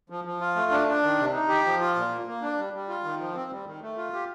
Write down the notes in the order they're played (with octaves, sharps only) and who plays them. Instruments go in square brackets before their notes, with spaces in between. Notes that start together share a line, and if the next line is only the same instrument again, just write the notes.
[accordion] F3
F3
F4
A3
D4
D4
D#3
C3
D#4
G4
F3
F4
A#2
A#3
A#3
D4
G3
G3
F4
D#3
F3
C4
G3
D#3
A3
F4
G4